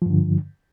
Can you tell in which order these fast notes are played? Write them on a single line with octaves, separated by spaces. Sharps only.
F3 G2 D3